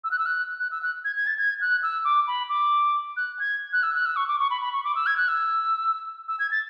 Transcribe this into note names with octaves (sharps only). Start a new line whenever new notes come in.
E6
F#6
E6
F#6
F#6
E6
F#6
G#6
G#6
A6
G#6
F#6
E6
D6
B5
D6
F#6
G#6
F#6
E6
F#6
E6
C#6
D6
C#6
B5
B5
C#6
D6
E6
G#6
F#6
E6
E6
G#6
A6